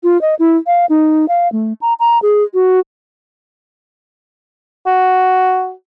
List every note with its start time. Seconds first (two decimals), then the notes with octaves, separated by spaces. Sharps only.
0.04 F4
0.21 D#5
0.39 E4
0.67 F5
0.89 D#4
1.28 F5
1.52 A3
1.81 A#5
2.00 A#5
2.22 G#4
2.54 F#4
4.86 F#4